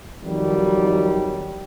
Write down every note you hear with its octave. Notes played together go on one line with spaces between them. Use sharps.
F2 D#3 F#3 G3